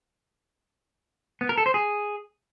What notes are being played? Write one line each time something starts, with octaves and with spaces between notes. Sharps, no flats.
B3
A#4
A4
C5
G#4